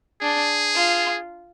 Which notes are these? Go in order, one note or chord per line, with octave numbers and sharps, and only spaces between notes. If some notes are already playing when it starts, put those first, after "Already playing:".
D4 G#4
F4